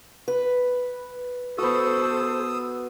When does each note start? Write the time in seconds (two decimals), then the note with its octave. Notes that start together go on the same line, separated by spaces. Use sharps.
0.28 B4
1.58 B3 F#4 A4 C5 D#6 E6